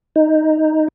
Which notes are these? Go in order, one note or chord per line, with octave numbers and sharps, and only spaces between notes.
D#4